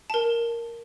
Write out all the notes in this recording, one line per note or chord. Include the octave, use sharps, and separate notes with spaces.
A#4 A5